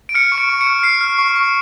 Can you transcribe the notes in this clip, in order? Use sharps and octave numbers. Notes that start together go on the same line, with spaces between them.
D7
F6 C#7
C#6
D7
C#6
C#7
F6
F6 C7
F6
C#6
C#6